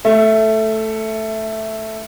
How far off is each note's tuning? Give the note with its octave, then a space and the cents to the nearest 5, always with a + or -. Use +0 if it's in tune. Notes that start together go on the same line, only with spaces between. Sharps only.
A3 +0 E5 +35